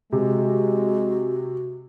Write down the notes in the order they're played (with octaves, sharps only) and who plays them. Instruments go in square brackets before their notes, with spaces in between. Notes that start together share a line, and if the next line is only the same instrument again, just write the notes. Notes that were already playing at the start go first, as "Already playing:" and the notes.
[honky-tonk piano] C3 [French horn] G#3 [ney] F#4